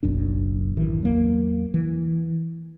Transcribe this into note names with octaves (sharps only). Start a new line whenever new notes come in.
F#1 B1 F#2 D4
A1 D#3 E3
E2 F#3 A#3
E3